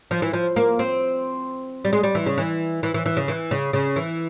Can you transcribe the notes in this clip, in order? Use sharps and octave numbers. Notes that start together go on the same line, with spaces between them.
F3
E3
F3
A#3
C4
G3
G#3
G3
E3
C#3
E3
E3
E3
E3
C#3
E3
C#3
C#3
E3